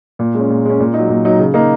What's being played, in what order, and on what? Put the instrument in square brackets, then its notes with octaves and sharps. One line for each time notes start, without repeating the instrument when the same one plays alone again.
[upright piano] A#2
G#3 C#4
A#2
G#3 C#4
A#2
F#3 D#4
A#2
F#3 D#4
C#3
A#3 D#4